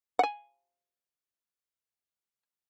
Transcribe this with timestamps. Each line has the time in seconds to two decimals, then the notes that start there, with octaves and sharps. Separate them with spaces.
0.19 F#5 G#5